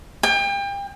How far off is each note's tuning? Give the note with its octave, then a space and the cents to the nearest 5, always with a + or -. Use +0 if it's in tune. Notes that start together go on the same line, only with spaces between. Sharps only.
G5 +35